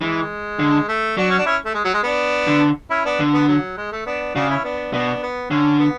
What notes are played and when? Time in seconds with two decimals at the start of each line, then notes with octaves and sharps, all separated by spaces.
0.01 E3 G#3
0.59 D3
0.88 A3
1.17 F#3 D4 F#4
1.30 C#4
1.39 D4
1.46 C#4 E4
1.65 A3
1.74 G#3
1.85 F#3
1.94 G#3
2.03 B3 D4
2.47 D3
2.90 C#4 E4
3.05 B3 D4
3.20 D3
3.34 B3
3.49 F#3
3.78 G#3
3.92 A3
4.06 B3 D4
4.35 C#3 D4 F#4
4.49 C#4 E4
4.64 B3 D4
4.93 B2 B3 D4
5.23 B3
5.51 D3 C#4
5.80 B3